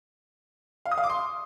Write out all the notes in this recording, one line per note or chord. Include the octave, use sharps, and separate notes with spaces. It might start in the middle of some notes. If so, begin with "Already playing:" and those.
F5
D#6
F5
D6
C6